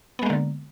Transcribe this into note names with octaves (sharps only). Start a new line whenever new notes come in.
D3 G#3 A#3 B3